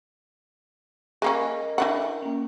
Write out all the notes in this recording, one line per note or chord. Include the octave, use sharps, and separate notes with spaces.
G#3 A#3 C#4 A#4 D#5
E3 D4 F#5
G5
A#3 C#4